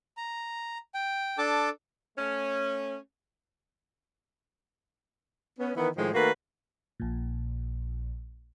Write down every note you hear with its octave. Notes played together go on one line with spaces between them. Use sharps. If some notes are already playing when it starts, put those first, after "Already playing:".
A#5
G5
D4 A4 A5 D6
A3 C#4
B3 C#4
D#3 E3 B3
A2 D#3 F3 G#3
D#3 A3 A#3 F#4 B4
A#1 A#2